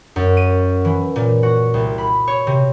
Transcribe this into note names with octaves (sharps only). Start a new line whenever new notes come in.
F#2
D#7
E3
A#2
F#4
C2
B5
C#5
C3